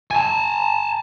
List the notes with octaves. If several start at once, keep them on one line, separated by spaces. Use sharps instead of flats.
G#5 A5